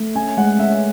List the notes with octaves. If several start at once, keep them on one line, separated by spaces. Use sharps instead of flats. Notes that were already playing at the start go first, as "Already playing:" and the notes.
Already playing: A3
C#4 G#5
G#3 F#5
C#4 E5